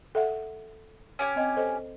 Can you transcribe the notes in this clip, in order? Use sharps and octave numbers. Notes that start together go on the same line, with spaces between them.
A4 E5 F#5
C#4 G4 G#5
C4 D#5 G5
A4 C5 D#5